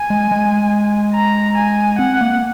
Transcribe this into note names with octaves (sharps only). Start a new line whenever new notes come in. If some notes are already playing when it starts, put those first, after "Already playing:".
Already playing: G#5
G#3
G#3
A#5
G#5
C4 F#5
A#3